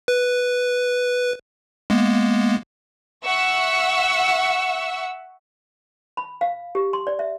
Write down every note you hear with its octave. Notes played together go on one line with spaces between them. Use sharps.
B4
G#3 A#3 B3
E5 F#5 C#6 E6
B5
F5
G4
C6
D5
E5